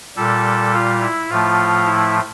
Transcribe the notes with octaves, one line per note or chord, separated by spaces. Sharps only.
A#2 G3 A4
F4
E4
A2 F3 A3 F4
E4